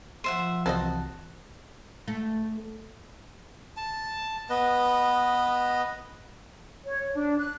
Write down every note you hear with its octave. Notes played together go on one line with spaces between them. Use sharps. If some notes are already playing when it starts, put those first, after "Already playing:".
F3 C5 E5 F#5
C2 E3 C4 F#4 C5 D#5 A5
A3
A5
B3 B4 D#5
C#5
D4
F#6